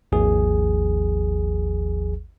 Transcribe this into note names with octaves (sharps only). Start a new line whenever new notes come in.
G#1 D#2 F3 G#4